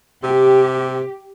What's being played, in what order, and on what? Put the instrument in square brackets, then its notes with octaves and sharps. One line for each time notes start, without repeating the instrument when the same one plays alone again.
[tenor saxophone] C3 [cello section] G4